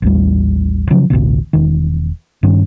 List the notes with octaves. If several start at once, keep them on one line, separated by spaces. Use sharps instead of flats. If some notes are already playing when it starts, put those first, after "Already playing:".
A1 D#2 G3
C#3 F3 F#3
A1 D2 B2 D3
E1 D#3
G2 D#3 C#4